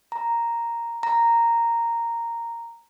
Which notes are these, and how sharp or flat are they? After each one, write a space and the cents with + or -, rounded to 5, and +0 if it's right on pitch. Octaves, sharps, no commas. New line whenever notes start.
A#5 +0
A#5 -5